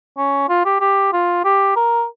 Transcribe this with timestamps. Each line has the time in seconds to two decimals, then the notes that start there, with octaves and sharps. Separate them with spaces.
0.18 C#4
0.49 F4
0.66 G4
0.81 G4
1.13 F4
1.45 G4
1.76 A#4